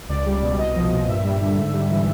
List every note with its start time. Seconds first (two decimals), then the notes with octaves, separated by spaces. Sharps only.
0.09 C#2 D5
0.26 G3
0.42 B2
0.58 C2 D#5
0.76 F3
0.92 A#2
1.08 G2 E5
1.24 G3
1.40 D3
1.58 G#2
1.73 G3
1.91 E3